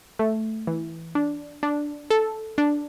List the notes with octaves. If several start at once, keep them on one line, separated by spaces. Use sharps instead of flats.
A3
E3
D4
D4
A4
D4